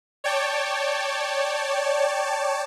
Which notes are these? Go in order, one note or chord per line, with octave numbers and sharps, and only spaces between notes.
C#5 D5 G5 A5